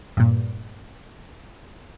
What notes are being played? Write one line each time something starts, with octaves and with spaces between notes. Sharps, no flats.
G2 A#2